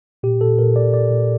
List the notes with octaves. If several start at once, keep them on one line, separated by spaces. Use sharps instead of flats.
A#2 G4
A#2 A4
A#2 A#4
A#2 D5
A#2 D5
A#2